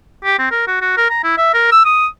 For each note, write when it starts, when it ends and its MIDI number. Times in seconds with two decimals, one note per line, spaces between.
0.25 0.39 67
0.39 0.48 60
0.51 0.63 70
0.67 0.77 66
0.82 0.97 66
0.97 1.09 70
1.10 1.23 82
1.24 1.35 64
1.38 1.53 76
1.54 1.67 70
1.72 1.83 88
1.85 2.07 87